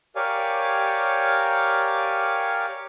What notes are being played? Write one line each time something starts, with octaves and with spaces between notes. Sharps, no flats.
G4 A#4 C#5 D5 F5 G#5